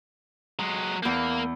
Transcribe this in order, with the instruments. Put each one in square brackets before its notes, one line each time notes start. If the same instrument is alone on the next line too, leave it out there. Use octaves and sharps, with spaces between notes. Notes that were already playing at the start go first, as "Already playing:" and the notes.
[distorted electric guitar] F#3 G#3
[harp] E2 G6 [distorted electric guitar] A#3